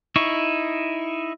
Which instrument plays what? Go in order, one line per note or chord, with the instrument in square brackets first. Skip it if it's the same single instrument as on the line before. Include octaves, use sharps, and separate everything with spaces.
[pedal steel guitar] D#4 E4 C#6